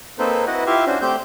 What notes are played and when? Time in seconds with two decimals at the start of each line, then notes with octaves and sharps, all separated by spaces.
0.19 A#3 C4 D#4 A4 B4 C5
0.47 E4 F#4 B4 D#5 F#5
0.66 E4 F4 G4 E5 F5
0.87 C#4 D4 F#4 C5
1.01 A3 C4 G4 C5 G6